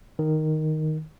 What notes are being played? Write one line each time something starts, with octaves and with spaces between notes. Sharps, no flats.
D#3